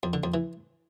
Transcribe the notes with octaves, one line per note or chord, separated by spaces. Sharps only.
F2
D3
F2
E3